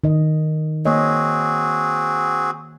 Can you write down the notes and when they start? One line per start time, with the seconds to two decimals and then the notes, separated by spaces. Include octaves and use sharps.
0.04 D#3 D#5
0.86 A#3 C4 F#4 G#4 C#5 D#5